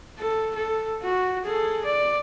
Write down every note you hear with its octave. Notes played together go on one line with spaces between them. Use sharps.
A4
A4
F#4
G#4 A4
D5